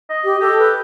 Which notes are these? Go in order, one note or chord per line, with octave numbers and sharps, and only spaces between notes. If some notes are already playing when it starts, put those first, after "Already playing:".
D#5
G4
G4 A4
B4